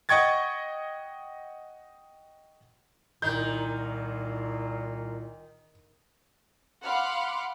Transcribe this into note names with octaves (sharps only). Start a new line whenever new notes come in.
D#5 F#5 G5 C#6 G#6 A6
C2 A#2 D#3 G6
F5 F#5 B5 C6 D6